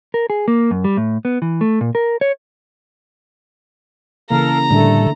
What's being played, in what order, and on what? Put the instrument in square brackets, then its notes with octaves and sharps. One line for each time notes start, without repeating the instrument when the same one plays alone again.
[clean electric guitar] A#4
G#4
A#3
F#2
G3
A2
B3
E3
A3
A#2
A#4
C#5
[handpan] C#3 E3 A#3 [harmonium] A4 A#4 F5 [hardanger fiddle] A#5
[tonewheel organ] A2 G3 [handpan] D3 D4 [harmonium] A3 A4